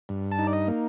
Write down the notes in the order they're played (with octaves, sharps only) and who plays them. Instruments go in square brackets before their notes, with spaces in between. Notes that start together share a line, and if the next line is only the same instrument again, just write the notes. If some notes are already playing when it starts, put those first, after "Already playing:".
[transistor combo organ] G2
A5
D#4
D5
D#5
A#3